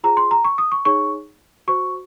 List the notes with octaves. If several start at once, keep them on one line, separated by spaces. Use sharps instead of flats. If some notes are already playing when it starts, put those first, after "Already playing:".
F4 G#4 C5 A#5
C6
A#5
C#6
D#6
C#6
D#4 G#4 C#5 C#6
F#4 C5 C#6